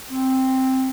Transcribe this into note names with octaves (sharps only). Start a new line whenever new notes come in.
C4